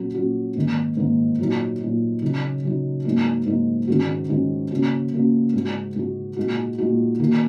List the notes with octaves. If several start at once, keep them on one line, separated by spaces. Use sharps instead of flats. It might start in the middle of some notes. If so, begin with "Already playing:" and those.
Already playing: A#2 F#3 C#4 F#4
A#2 F#3 C#4 F#4
G#2 D#3 A#3
G#2 D#3 A#3
A#2 F#3 D#4
A#2 F#3 D#4
C#3 F#3 D#4
C#3 F#3 D#4
G#2 F#3 A#3 D#4
G#2 F#3 A#3 D#4
G#2 D#3 G#3 C#4 F#4
G#2 D#3 G#3 C#4 F#4
C#3 A#3 C#4 F#4
C#3 A#3 C#4 F#4
G#2 G#3 F#4
G#2 G#3 F#4
A#2 G#3 D#4 F#4
A#2 G#3 D#4 F#4
D#3 A#3 D#4 F#4